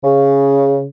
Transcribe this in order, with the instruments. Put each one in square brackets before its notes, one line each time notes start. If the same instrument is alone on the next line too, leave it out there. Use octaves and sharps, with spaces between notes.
[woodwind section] C#3